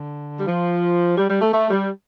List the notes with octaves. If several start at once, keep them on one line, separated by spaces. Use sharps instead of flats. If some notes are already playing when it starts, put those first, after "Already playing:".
Already playing: D3
G3
F3
G3
G3
A3
A3
G3